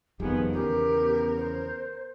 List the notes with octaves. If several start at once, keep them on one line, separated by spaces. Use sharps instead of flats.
F#1 F2 D#3 F3 G3 B3 G#4
E2 C#3 B3 G4 A#4
C5